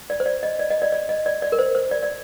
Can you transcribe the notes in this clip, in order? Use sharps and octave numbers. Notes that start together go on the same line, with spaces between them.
D5
C5
D5
D#5
D5
D#5
D5
D5
D#5
D5
D5
A#4
C5
C5
D5
D5